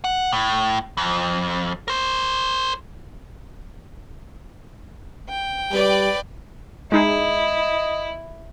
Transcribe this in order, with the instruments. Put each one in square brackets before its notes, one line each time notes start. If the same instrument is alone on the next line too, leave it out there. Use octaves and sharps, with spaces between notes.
[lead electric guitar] F#5
A2
F2
A#4 C5
[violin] G5
[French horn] G3 [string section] B4 D5
[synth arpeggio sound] G#3 D#4 G#4 [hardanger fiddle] E4 [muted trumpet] D#5